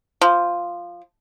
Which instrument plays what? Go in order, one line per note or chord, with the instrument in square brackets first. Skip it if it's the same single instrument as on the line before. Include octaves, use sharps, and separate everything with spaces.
[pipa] F3